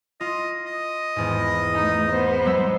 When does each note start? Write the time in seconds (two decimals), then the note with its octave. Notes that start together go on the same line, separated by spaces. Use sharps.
0.21 F4 D#5
0.66 D#5
1.16 G#1 E2 G#2
1.75 A3 D#4
2.09 B3 C5
2.45 F#3 G#3 E6